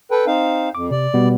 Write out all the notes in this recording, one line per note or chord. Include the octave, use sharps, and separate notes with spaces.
A4 B4 G5
C4 D#4 F5
F2 D6
C3 D5
B2 G3 B3